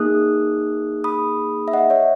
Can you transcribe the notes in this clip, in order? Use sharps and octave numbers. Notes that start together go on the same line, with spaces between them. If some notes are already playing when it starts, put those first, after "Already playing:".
Already playing: A#3 D#4 G#4 D#6 F#6
B5 D#6
E5
D#5 F#5
C#5 E5